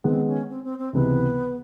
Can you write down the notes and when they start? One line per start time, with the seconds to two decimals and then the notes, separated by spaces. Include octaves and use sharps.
0.04 D#3 G#3 B3 C4
0.27 C#4
0.50 C4
0.64 C4
0.78 C4
0.93 C#2 C3 E3 B3